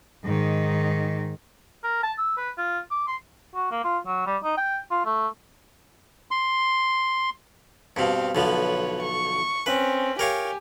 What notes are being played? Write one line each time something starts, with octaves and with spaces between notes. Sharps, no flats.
G#2 D#3
A#4
A5
E6
B4
F4
D6
C6
F#4
A#3
F4
F#3
G3
D#4
G5
F4
A3
C6
G2 B2 C4 F5
B1 D3 F3 B4 C#5
C#6
C4 C#4 B4
G4 A#4 C#5 F5 G#5